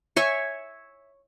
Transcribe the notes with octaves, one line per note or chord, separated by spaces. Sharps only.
C#5 E5 G#5